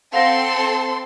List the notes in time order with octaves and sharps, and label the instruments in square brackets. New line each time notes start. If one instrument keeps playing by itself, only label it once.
[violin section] C4 A4 C6 [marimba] F5 F#5 A#6